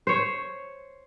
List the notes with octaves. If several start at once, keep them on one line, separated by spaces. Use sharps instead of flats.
C5 C#5